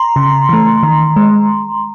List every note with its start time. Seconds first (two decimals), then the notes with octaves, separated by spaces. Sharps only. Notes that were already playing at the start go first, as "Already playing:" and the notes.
Already playing: A#5 C6
0.16 C#3
0.49 E3 A3
0.83 D#3
1.16 G#3